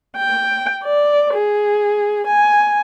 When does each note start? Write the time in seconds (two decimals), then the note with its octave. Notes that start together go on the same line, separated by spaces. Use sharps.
0.17 G5
0.84 D5
1.34 G#4
2.27 G#5